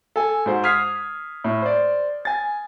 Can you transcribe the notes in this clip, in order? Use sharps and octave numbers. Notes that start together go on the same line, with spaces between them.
A4 G#5
G#2 F#4 C5
D#6 F6 G#6 B6 C7
A2
C5 D5
G#5 A6